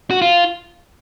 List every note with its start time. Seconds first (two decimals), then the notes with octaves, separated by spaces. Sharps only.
0.11 F#4
0.22 F4